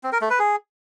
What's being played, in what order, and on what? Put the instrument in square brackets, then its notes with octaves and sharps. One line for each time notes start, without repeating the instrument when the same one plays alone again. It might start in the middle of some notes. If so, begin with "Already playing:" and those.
[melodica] C4
A#4
A3
B4
G#4